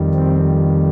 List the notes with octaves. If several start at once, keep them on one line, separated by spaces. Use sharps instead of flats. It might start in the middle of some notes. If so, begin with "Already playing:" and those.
Already playing: F2 D#3 G3
C4